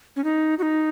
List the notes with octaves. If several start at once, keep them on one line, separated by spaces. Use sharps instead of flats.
C#4
D#4
F#4
D#4